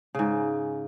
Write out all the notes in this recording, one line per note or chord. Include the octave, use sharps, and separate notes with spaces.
G#2 C#3